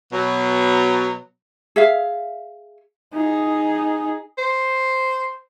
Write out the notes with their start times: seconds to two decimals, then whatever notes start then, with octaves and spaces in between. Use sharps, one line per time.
0.12 B2 F#3
1.76 G#4 E5 F5
3.14 D#4 G#4
4.38 C5